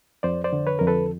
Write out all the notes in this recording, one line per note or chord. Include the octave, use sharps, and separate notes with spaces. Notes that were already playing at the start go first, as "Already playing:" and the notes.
F2 C5 D5
C5 D5
D3
B4 C#5
F2 A#4
A4 B4